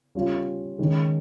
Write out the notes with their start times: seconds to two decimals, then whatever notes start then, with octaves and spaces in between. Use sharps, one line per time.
0.15 G3 C#4 F4
0.78 D#3 G#3 C#4